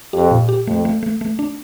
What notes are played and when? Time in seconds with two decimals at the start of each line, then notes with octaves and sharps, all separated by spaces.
0.13 F2 G4
0.31 A#2
0.49 G4
0.67 F2 A3
0.85 A3
1.03 A3
1.21 A3
1.39 D4